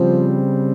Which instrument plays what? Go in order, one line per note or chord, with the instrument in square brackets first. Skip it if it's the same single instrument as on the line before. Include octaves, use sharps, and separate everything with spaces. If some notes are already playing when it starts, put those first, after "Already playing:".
Already playing: [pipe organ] C#3 G3 C4 [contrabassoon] F3